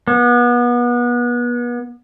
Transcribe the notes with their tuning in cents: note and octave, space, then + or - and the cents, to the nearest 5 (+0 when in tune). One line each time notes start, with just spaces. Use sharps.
B3 -30